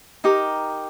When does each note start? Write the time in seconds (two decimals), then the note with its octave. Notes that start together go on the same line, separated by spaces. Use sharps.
0.24 D#4 G4 A#4